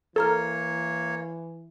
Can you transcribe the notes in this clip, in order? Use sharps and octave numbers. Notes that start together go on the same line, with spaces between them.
E3 A#3 A4 A#4 C#5 A#5 F6